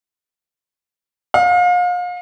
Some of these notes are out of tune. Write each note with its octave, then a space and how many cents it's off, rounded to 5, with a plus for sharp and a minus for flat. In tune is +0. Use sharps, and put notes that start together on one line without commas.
F5 +35